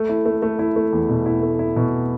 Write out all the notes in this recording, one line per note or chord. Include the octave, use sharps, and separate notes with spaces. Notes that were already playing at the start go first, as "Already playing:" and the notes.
Already playing: A3
E4
A3
A3
E4
A3
E2
B2
E4
A3
E4
B2